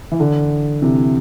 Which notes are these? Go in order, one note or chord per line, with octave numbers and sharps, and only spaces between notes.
E3
D3
C3 E3